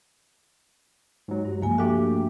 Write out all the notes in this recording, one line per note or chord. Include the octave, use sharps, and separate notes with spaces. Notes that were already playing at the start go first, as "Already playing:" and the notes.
G#2 F#3
G2
C#2 F3 A#3 G#5
A3 A#3 D4 F#4 G4